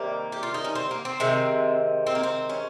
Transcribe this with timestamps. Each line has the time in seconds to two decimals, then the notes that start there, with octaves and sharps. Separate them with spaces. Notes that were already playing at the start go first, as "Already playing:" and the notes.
Already playing: C3 D#3 G3 A#3
0.32 G4
0.43 F4
0.54 D#4
0.64 C#4
0.75 C4
0.91 A#3
1.05 C4
1.20 C3 D#3 G#3
2.07 C4
2.15 A#3
2.23 C4
2.49 C#4